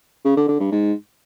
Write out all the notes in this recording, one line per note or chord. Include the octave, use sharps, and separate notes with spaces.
C#3
D3
D3
G2
G#2